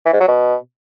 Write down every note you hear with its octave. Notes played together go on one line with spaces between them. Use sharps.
E3
G#2
F#3
B2